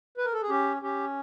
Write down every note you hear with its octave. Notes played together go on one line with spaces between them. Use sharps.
B4
A#4
A4
G#4
C#4 G4
C#4 G4